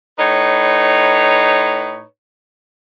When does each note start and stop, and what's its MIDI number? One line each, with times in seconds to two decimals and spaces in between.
0.19 2.02 45
0.19 2.02 63
0.19 2.02 71
0.19 2.02 73